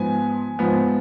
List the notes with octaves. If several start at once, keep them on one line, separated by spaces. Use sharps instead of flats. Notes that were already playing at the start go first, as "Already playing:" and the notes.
Already playing: G#2 F3 B3 G#5
G#2 F3 B3